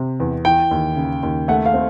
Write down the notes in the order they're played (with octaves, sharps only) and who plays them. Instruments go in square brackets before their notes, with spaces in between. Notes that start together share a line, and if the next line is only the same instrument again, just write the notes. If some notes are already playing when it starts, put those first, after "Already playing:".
Already playing: [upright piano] C3
E2
[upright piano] E3 [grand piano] G5
[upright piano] D#2
C#3
D#2
[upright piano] A3 [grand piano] F#5
[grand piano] F5
[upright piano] C4